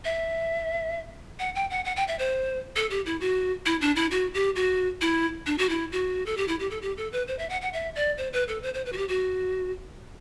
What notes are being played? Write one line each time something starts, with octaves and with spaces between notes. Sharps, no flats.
E5
F#5
G5
F#5
F#5
G5
E5
C5
A4
G4
E4
F#4
E4
D4
E4
F#4
G4
F#4
E4
D4
F#4
E4
F#4
A4
G4
E4
G4
A4
G4
A4
B4
C5
E5
F#5
F#5
E5
D5
C5
B4
A4
C5
C5
B4
F#4
G4
F#4